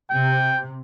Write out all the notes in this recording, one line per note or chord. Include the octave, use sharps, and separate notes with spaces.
C3 G5